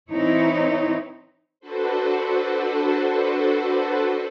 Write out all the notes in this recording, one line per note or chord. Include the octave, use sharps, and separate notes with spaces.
E3 C4 D#4 E4 C#5
D4 F#4 A4 B4 C5